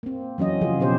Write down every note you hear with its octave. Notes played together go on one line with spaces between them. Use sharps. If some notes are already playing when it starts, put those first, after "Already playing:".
A#3 C4
E3 F#3 C#4 D#5
C#3 F3 F4 G#4
B2 G4 G#4 C5